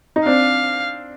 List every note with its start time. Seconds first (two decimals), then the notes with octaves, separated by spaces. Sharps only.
0.16 D#4
0.26 C4 D4 F5